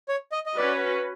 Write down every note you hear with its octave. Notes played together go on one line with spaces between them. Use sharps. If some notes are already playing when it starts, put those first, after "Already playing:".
C#5
D#5
D#5
C#4 F#4 B4 D5